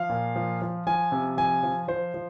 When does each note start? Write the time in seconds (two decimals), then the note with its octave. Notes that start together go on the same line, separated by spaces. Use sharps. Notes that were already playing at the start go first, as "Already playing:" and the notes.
Already playing: F3 F5
0.10 A#2
0.36 F3
0.62 F3
0.87 F3 G#5
1.12 C3
1.37 F3 G#5
1.63 F3
1.88 F3 C5
2.14 F3